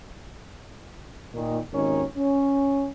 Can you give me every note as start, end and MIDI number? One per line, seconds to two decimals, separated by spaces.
1.33 1.57 46
1.33 1.57 51
1.72 2.03 32
1.72 2.03 39
1.72 2.03 51
1.72 2.03 61
1.72 2.03 70
2.16 2.88 61